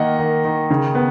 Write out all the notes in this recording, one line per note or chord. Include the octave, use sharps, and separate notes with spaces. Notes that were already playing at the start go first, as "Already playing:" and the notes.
Already playing: D#3 A#3 D#5 F#5
D#3
D#3
C#3
B3